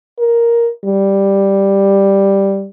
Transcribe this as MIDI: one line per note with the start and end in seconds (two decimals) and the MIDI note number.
0.19 0.69 70
0.85 2.66 55